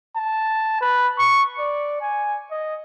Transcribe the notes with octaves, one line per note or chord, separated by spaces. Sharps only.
A5
B4
C#6
D5
G#5
D#5